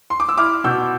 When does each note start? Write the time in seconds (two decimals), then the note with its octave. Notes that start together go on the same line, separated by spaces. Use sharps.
0.10 C6
0.20 D6
0.29 E6
0.38 E4 D6 F6
0.64 B2 E6 G6